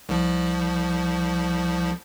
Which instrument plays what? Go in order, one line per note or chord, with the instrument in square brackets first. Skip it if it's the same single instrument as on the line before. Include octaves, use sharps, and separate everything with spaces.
[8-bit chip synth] C2 F3